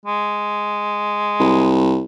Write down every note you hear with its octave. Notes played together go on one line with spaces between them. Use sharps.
G#3
C2